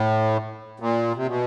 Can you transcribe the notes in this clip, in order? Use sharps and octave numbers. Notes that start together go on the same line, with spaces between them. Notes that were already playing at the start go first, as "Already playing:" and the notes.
Already playing: A2
A#2
C3
B2